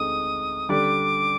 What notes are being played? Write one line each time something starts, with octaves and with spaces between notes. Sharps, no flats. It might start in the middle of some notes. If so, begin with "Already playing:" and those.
Already playing: D2 D3 G#3 C4 D#4 D#6
D3 G3 D4 G4 D5 D6